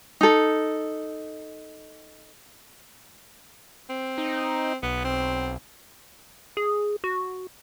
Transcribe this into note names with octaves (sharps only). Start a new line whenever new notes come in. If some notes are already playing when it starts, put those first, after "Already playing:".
D#4 A4
C4
D#4
B1 B3
C4
G#4
F#4